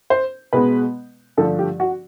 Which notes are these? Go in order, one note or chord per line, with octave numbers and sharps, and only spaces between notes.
C5
B2 G#3 B3 B4
G2 D3 F3 A3 A4
G4
F#4